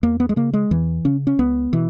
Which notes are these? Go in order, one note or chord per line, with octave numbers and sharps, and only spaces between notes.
E2 A#3
B3
G#3
C#3 A#3
G#3
E2 E3
C#3 C#4
C#4
C#2 B3
B2 E3